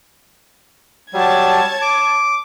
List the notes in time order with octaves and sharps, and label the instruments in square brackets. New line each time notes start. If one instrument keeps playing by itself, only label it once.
[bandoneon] F#3 G3 [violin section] C#5 A5 G#6
[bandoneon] D6